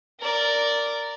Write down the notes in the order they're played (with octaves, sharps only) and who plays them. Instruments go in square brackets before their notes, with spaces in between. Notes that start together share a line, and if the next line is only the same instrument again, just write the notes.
[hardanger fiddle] A#4 D5